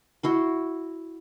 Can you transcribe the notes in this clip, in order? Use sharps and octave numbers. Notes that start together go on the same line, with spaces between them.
E4 F#4 C6